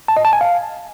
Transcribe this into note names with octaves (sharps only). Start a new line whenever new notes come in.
A5
D#5
A5
G#5
F5